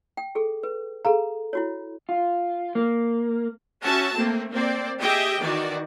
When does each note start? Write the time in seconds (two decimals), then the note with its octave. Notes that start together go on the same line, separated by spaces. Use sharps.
0.17 G5
0.35 G#4 A4
0.63 B4
1.05 G#4 A4 F5 A#5
1.53 E4 F#4 C#5
2.09 F4
2.75 A#3
3.83 C#4 F#4 E5 A5
4.15 A3 A#3 C4
4.51 A#3 C4 C5 D5
4.99 G4 G#4 D#5 E5 G5
5.41 D#3 E3 F#4 D5